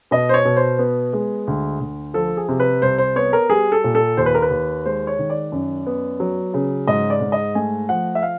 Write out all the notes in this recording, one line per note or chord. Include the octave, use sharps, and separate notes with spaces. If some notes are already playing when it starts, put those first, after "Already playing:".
B2 D#5
C5
C#5
B2
C5
B3
G#3
D2
D2
F3 A4
G#4
C3
B4
C2 C5
C5
B3 C#5
A#4
G3 G#4
A4
A#2
A4
D#2 C5
B4
A#4
B4
D#2
G#3 C5
C#5
D#3
D5
F#2
B3
F#3
C#3
G#2 D#5
D5
G#2
D#5
A3 G#5
F3 F#5
E5
F5